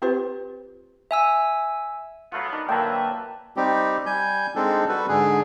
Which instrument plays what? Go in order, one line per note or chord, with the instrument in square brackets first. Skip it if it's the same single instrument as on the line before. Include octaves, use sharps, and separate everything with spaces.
[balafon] C4 F4 G4 B4 C5
[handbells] E5 G#5 E6
[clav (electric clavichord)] F#3 A3 F4 [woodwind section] B3
[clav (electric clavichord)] D4 A#4 [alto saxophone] D#4
[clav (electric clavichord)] A#2 D3 F#3 [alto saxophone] A#3 [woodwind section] B4 E5 [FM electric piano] G5 A5
[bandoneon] G3 C4 D#4 G4
G3 G#5 G6
G#3 C4 D4 D#4 A4
G3 F#4 A4 B4
G#2 D3 G#4